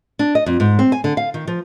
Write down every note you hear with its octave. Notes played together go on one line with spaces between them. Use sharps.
D4
D#5
F2
G#2
C4
G#5
D3
F5
D#3
F3